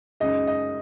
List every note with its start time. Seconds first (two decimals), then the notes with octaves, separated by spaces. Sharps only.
0.20 F#2 C#3 G#3 D#4 D#5
0.47 D#5